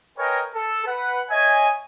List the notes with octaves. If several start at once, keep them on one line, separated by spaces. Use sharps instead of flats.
A#4 B4 C#5 D#5 G5 G#5
A4
B4 F#5
C#5 D#5 E5 G#5